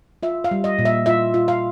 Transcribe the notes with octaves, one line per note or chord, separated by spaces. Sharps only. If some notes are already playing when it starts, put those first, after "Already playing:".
F4 E5
F5
G3
D#5
A#2
E5
F4 E5
F4
F5